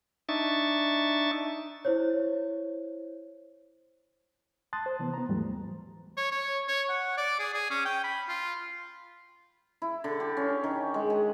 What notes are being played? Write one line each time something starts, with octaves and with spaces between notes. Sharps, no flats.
D4 D#4 E5 C#6 A6
E4 C5 C#5
A5 C6 D#6 F#6 A6
C5
C3 E3 B3
B3 A#5
D#2 G#2 E3 F#3 G3 A3
C#5
C#5
C#5
F#5
D5
G#4
G#4
C#4
G5
B5
F4
E4
D3
G4
C#4
D#3
G#3
G#4